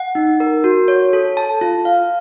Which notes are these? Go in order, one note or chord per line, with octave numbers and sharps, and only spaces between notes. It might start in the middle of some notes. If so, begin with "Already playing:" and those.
Already playing: F#5
D#4
A#4
F#4
C#5
A4
A5
F4
F5